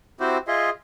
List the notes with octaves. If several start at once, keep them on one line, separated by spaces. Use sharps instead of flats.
C4 E4 F#4 G4 C5
F4 G#4 D#5 E5 C6